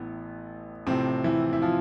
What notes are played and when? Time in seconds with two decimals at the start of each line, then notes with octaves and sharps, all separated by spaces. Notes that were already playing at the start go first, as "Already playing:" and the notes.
Already playing: A1 A2 E3 B3
0.87 A1 A2 C3 F3 C4
1.24 E3 E4
1.53 E4
1.62 F3 F4